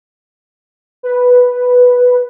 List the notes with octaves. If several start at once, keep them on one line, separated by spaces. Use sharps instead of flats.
B4